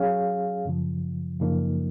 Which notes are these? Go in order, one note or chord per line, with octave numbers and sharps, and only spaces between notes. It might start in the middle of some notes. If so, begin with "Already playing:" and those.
Already playing: F#3 C#4 G#4 C#5 F5
F#2 C#3 F3
F#2 C#3 F3 A#3 D#4